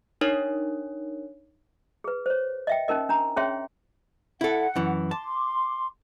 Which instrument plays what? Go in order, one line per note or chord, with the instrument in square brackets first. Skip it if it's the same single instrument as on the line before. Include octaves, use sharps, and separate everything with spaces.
[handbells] D4 D#4 A#4 C#5
[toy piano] G#4 B4
C5 C#5
D#5 E5 G5
C#4 D#4 A#4 D#5
D4 A#5
C#4 G#4 C#5 E5 G5 C6
[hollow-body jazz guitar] E4 A4 [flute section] F#5
[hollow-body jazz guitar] F#2 E3
[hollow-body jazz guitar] A5 [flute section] C6 D6